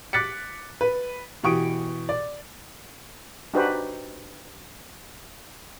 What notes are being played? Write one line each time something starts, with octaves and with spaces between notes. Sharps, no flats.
D6 F#6 A6 B6 C#7
B4
B2 E3 G4 C#6 D#6 D7
D5
D4 D#4 F#4 G4 B4 C5